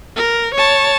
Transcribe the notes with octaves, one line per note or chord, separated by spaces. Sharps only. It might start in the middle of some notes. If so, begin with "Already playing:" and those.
A#4
C#5 A5